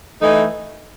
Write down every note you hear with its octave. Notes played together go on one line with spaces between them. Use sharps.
E3 A3 D#4 A4 D#5